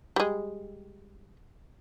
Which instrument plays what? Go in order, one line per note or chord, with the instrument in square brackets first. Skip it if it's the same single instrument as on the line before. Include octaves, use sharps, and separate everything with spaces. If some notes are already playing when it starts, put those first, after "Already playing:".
[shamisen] G3 G#3